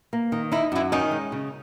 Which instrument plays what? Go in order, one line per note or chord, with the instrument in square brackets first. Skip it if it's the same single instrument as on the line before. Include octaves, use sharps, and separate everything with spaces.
[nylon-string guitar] A#3
D#3
[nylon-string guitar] D#4 [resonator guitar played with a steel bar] E4
[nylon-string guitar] F#2 [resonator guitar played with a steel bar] E3 E4
[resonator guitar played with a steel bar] D#3 D#4 [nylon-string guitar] C#4
[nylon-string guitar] G#3
C#3